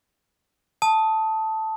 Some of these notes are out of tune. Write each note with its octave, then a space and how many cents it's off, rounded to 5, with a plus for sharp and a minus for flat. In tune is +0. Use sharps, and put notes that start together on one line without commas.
A5 +0 D#6 +20